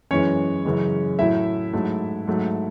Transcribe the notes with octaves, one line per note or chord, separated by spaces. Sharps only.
F#2 E3 G#3 C#4 C#5
F#2 C#3 E3 G#3
A2 F#3 A3 E4 E5
G#2 F#3 A3
G#2 F#3 A3